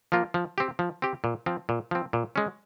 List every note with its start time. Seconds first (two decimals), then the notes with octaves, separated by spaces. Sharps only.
0.12 F3 A#3 F4
0.34 F3
0.58 C4 G4
0.79 F3
1.02 C4 G4
1.24 A#2
1.46 F3 C4
1.69 A#2
1.91 F3 C4
2.13 A#2
2.36 G#3 C#4